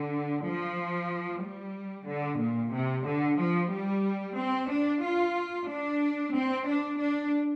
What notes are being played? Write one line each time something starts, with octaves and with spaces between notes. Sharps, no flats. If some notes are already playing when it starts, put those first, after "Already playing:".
Already playing: D3
F3
G3
D3
A#2
C3
D3
F3
G3
C4
D4
F4
D4
C4
D4
D4